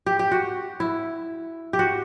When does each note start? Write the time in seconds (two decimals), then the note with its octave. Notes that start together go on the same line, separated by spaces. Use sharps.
0.06 G4
0.19 G4
0.32 F#4
0.80 E4
1.73 G4
1.79 F#4